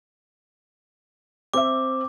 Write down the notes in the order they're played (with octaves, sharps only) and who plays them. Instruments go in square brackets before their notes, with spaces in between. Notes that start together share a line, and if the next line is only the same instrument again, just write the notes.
[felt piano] C4 E5 [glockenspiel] D6